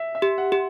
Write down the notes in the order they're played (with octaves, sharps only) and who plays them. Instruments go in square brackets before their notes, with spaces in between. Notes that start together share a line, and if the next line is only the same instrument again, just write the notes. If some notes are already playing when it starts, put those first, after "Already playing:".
Already playing: [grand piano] E5
E5
[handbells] G4
[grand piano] F#5
[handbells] G4